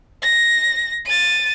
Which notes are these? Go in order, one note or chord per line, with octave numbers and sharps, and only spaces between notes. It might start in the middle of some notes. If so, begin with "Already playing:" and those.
A#6
A6 D#7